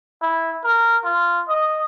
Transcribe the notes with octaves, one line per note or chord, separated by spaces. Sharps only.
E4
A#4
F4
D#5